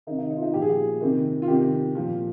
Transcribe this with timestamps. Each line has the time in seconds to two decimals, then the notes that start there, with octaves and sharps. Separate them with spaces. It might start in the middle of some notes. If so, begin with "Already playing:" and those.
0.07 D#3 D#4
0.10 C3
0.19 D#4
0.30 D#4
0.37 F4
0.42 D#4
0.54 A#2 F3 G4
0.62 G#4
0.70 G4
1.01 C3 D#3
1.42 F4
1.48 C3 D#3 G4
1.95 A#2 F3